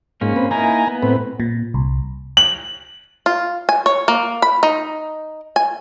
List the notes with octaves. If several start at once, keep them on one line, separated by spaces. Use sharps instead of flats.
G#2 A#3 C#4 F4
C4 B4
A#3 D#4 E4 G#5 A#5
B3
A2 C4 B4
A#2
C2
F#7
F4
G#5
C#5
A#3
B5
D#4
G#5